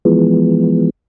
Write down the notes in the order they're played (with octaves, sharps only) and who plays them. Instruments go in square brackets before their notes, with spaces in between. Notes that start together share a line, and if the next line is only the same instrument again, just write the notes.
[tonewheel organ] E3 F3 G#3 B3